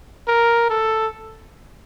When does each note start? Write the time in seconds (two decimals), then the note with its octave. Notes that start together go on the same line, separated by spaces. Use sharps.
0.28 A#4
0.70 A4